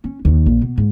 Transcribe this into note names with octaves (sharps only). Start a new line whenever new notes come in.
C#4
D#2 D#3
A#1
B2
G#2